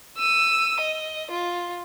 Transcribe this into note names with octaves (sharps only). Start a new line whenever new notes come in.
E6 D#7
D#5
F4